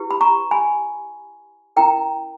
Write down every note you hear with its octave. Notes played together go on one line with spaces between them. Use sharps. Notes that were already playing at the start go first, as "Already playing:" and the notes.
Already playing: E4 G4 B4
B5
A#5 C#6
G#5 B5
C#4 E4 A#4 G5 A#5